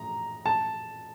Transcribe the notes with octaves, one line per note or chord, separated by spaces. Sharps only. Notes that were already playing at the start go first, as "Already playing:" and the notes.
Already playing: A#5
A5